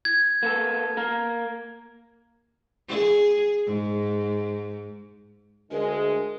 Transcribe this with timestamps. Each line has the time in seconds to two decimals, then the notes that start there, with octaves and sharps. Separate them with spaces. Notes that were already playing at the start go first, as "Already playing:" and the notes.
0.05 G#6
0.43 A#3 B3 A4
0.97 A#3 A#4
2.88 G#4
3.66 G#2
5.71 D2 D3 G#3 G#4 A#4